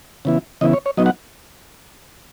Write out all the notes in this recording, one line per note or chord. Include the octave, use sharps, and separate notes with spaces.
C#3 E3 B3 E4
C#3 E3 B3 E4 D#5
C#5
C#5
F#3 B3 D#4 D#5
F#5